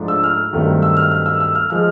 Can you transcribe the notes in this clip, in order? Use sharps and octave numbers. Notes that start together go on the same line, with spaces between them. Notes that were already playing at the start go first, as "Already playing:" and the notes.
Already playing: G#2 F3 A3 D4
E6
F6
G2 D#3 F#3 A3 C4
E6
F6
F6
E6
E6
F6
F3 G#3 F6